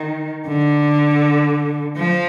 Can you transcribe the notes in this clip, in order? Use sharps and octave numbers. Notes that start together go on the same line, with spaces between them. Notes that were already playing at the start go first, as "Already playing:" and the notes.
Already playing: D#3
D3
F3